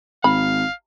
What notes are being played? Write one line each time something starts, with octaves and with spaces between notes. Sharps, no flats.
G#1 F5 B5